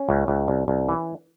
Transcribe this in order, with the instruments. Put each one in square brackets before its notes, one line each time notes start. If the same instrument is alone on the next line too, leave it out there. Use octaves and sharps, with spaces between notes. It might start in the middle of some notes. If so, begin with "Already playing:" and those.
Already playing: [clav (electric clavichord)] C#4
C#2
C#2
C2
C2
E3